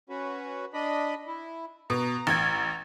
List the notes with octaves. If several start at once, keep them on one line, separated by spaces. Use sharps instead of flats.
C#4 F#4 B4
D4 D#5 B5
E4
B2 A#5
A1 G#6